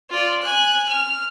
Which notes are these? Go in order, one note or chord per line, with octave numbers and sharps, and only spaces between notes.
F4 D5
G#5 F#6
F6